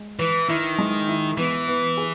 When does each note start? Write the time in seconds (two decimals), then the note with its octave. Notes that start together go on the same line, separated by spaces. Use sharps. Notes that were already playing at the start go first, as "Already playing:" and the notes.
Already playing: G#3
0.19 E3 B4
0.48 D#3 E4
0.78 G#3
1.08 E4
1.37 E3 B3
1.68 B3
1.97 G#4